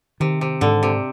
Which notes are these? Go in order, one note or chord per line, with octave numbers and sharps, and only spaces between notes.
C3 D#3
C3
G#2 D3
C3